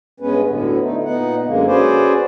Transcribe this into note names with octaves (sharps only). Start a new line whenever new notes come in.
G2 G#3 B3 C#4 B4
D2 A2 D3 B3
A3 D#4
A#2 B3 D#4 F#5
F#2 D3 G#3 A#3
C#4 F#4 G#4 B4 C5 D5